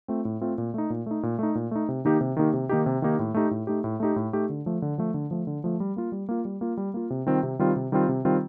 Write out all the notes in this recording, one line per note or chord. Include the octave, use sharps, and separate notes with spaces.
A3 C4 F4
A2
A3 C4 F4
A#2
A3 D#4
A#2
A3 D#4
A#2
A3 D#4
A#2
A3 D#4
C3
D#3 A#3 D#4 G4
C3
D#3 A#3 D#4 G4
C3
D#3 A#3 D#4 G4
C3
D#3 A#3 D#4 G4
A2
A3 D#4 G4
A2
A3 D#4 G4
A2
A3 D#4 G4
A2
A3 D#4 G4
D3
F3 A3
D3
F3 A3
D3
F3 A3
D3
F3 A3
G3
A#3 F4
G3
A#3 F4
G3
A#3 F4
G3
A#3 F4
C3
D#3 G3 C4 F4
C3
D#3 G3 C4 F4
C3
D#3 G3 C4 F4
C3
D#3 G3 C4 F4